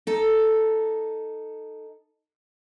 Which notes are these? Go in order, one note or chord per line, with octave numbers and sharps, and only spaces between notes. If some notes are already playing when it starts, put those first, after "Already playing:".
D#4 A4